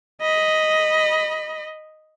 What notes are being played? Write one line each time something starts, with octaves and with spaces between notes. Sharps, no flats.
D#5 B5